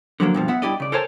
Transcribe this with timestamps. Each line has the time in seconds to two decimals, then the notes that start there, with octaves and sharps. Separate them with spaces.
0.20 D3 F3 F#3 A#3
0.35 G2 B2 F3
0.48 B3 E5 F#5
0.62 G2 E4 G4 D5 D#5
0.80 C#3 D5
0.92 A4 A#4 C5 C#5 G#5 A5